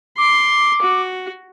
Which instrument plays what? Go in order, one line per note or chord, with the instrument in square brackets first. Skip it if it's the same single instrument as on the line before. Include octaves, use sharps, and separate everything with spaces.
[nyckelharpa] C6 [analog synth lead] D6
[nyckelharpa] F#4